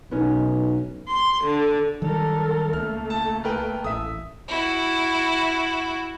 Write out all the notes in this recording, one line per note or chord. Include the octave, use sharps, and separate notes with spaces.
B1 B3 C#4 D#4
C6
D3
D#3 F#3 G3 A4 A#4
C#2 A3 A#3 F6
A5
A#4 B4 G5
A1 E5 D#6
E4 F#4